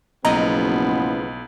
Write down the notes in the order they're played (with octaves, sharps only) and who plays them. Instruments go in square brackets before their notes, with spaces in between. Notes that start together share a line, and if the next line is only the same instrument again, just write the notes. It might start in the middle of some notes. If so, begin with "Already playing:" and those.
[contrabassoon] F#1 [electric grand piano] B1 [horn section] F3 G#3 B3 [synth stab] D#5 A#5